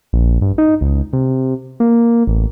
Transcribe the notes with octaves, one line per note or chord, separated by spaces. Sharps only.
A#1
G2
D#4
C#2
C3
A#3
A1